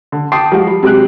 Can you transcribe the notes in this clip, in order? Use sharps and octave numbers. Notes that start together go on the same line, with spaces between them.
D3
G5 A5 C6 D6 D#6 C7
F3 F#3 G#3 F#4 G4
G3
C3 F#3 G#3 G4 F#6